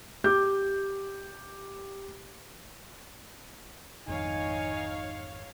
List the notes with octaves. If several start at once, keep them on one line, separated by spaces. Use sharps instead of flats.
G4 D6 G6
G#1 F2 D#3 D#4 C#5 F5 G#5